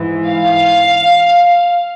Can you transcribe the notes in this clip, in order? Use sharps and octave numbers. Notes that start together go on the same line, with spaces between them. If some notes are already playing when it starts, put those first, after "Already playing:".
Already playing: G#2 E3
F5